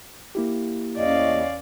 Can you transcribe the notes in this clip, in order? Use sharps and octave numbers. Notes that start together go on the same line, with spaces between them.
A#3 E4 G4
E2 C#4 D5 D#5 F5